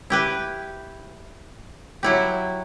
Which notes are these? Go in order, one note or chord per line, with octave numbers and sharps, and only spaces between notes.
E4 G4 B4
F#3 E4 G4